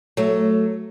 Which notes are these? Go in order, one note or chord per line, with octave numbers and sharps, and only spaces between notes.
F#3 A3